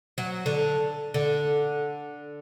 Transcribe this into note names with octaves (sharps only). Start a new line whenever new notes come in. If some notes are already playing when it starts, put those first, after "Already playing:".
F#3
D3
D3